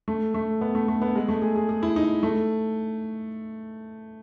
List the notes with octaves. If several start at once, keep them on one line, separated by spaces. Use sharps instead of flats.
A3
A3
B3
A3
A3
B3
G#3
A3
G#4
G#4
G#4
E4
D#4
A3